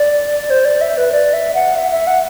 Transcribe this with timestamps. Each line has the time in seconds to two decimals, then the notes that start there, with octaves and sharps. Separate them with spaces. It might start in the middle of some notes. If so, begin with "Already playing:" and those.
Already playing: D5
0.50 C5
0.65 D5
0.81 E5
0.97 B4
1.12 D5
1.33 E5
1.54 F#5
1.75 E5
1.92 E5
2.07 F#5